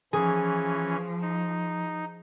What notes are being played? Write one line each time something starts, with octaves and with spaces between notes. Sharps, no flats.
E3 F3 C#4 G#4
D#4